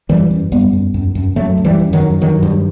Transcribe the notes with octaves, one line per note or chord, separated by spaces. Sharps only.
F#2 E3 G3
F#2
F#2 G3 B3
F#2
F#2
F#2
F#2 F#3 A3
F#2
E3 G3
F#2
D#3 F#3
F#2
G2 D#3 F#3
G2